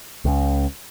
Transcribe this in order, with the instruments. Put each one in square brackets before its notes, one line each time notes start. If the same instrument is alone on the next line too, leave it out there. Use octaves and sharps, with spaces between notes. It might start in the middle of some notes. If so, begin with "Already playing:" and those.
[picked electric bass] C#2 C#3